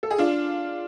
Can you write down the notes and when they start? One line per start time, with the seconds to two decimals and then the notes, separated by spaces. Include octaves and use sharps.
0.03 A4
0.11 G#4
0.18 D4 F4